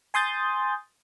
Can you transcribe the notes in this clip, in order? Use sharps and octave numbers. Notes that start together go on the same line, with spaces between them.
G#5 C6 D#6 G6 A6